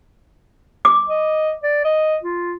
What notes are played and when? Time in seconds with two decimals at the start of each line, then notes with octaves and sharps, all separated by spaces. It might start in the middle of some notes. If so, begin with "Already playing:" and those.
0.85 D6
1.09 D#5
1.63 D5
1.85 D#5
2.23 F4